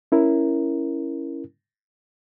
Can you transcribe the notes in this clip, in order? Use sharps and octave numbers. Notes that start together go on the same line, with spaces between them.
C#4 E4 A#4